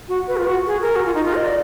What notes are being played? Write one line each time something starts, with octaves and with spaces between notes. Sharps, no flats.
F#4
B4
F4
F#4
G#4
A#4
F#4
F4
D#4
F4
D#5
D5